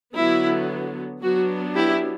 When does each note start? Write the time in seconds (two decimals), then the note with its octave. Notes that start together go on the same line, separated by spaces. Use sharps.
0.15 D3 F#3 B3 E4
1.22 F#3 B3 D4 F#4
1.75 E4 G4